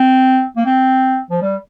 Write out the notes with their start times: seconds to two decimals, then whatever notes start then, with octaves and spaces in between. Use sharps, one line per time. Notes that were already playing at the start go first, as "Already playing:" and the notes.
Already playing: C4
0.57 A#3
0.66 C4
1.30 F3
1.42 G3